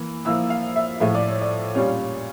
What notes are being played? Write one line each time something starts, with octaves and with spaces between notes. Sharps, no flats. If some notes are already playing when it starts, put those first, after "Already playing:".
Already playing: E3 A#3
F3 A#3 E4 E6
F5
E5
A2 F3 A3 E5
D5
C#5
D5
A#2 G3 C#4 F4 C#5